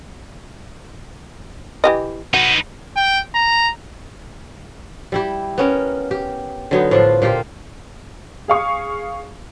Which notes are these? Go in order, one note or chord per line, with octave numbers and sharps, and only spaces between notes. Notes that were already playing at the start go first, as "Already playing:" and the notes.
E3 G4 D#5
D#4 F#4 B4
G5
A#5
G3 E4 G4
B3 C#4 A#4
G4
D3 F#3 B3 D#4
A2 F3 D4 F4
A#2 A#3 F4 G4
G#4 F5 C#6 D#6